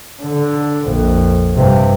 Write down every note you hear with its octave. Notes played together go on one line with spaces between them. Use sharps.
D3
A#1 F2
G2 C3